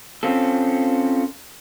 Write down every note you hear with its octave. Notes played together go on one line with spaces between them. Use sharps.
C4 C#4 F4 A4